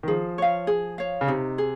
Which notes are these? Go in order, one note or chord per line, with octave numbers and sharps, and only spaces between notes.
D#3
F3 G#4
C#5 F5
G#4
C#5 F5
C#3
C3 D#4
G#4